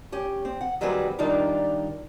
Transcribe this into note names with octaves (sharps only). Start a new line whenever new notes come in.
C#4 G4
C4
F#5
D#3 F#3 G3 C4 G#4 B4
D#3 G3 D4 D#4 F4 D5